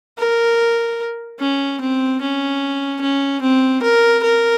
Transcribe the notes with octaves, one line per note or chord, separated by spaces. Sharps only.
A#4
C#4
C4
C#4
C#4
C4
A#4
A#4